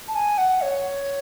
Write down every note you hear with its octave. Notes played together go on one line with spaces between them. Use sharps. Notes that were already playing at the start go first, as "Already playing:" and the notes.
A5
G#5
F#5
C#5